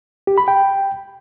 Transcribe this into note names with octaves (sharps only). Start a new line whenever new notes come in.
G4
B5
G5